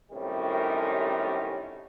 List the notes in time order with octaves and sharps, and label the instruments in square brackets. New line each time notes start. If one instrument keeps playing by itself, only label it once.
[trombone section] F#2 A2 C3 D#3 G3 C#4